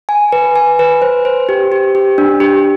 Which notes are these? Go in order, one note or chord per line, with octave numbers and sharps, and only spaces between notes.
G#5
B4
G#5
B4
C5
C5
G4
G4
G4
D4
G4